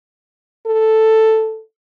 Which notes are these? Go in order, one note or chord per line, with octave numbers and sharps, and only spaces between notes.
A4